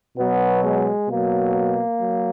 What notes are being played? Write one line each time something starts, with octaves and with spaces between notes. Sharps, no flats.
B2 F#3 B3
G#3
B2 F#3 A#3
F#3